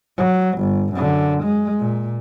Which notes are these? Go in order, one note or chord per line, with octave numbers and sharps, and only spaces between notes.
F#3
G1
F#2 D3
G#3
A#2